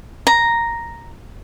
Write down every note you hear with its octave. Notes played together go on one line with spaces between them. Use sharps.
A#5